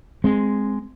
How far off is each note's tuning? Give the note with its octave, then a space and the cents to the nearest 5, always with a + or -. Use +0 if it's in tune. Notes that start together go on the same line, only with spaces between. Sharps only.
G#3 +0 C4 +0